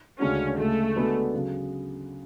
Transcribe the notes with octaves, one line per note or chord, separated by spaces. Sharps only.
D2 C#3 G#3 C#4 D4 F#4
D2 C#3 G#3 A3
D3 G#3 B3 D4 F#4
C#3 F#3